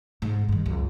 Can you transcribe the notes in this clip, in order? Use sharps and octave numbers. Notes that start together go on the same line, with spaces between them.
G#2
G2 D#3
C#2 F#2